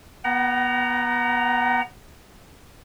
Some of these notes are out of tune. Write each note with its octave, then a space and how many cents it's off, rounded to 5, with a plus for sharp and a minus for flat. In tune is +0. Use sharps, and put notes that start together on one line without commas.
B3 -20 F#5 +40 A#5 +0